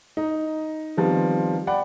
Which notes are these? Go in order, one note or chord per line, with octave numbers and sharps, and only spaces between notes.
D#4
D#3 F3 G3 B3 C4
D5 F#5 G5 B5